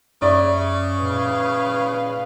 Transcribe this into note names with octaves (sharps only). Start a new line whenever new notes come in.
F#2 C#3 D5 E5
A#2 B4 F5